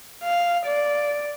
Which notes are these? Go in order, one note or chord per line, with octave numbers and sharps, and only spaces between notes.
F5
D5